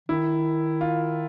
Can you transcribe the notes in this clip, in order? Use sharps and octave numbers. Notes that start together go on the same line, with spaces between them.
D#3 E4
F4